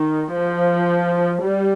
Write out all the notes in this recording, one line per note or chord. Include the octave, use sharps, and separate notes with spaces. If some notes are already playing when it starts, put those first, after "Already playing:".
Already playing: D#3
F3
G3